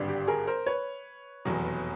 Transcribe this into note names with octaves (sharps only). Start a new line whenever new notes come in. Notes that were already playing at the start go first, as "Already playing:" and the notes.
Already playing: G#1 G2 D3 G3
G4
G#4 A#4
A#4 C5
B4 C#5
F1 E2 B2 F#3